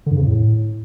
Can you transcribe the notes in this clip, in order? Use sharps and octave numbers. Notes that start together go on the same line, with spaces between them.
D3
G2
C#3
F2
A2